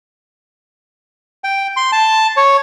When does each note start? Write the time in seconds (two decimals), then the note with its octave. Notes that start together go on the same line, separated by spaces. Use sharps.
1.44 G5
1.77 C6
1.92 A5
2.37 C#5